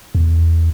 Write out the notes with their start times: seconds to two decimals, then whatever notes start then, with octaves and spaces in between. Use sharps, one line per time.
0.15 E2